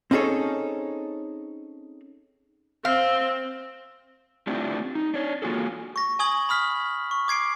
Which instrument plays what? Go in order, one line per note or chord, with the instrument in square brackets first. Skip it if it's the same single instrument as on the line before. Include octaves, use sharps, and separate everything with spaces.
[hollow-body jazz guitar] C4 C#4 D#4 G#4 A4 C#5
[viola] C4 [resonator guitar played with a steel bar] F5
[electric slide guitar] A3 C4 D4 E4 F4 G4
D#4
D4 C#5
A#3 F4 F#4 G#4 A4
[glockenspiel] C#6 A#6
G#5 C#6 D#6 G#6 F#7
B5 D#6 F6 B6
C#6
D6 G#6 C7 D7